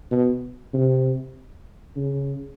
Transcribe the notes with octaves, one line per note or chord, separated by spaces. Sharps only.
B2
C3
C#3